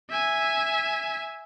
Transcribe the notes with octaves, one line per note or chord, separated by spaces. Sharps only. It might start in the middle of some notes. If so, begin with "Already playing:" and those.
E5 G#5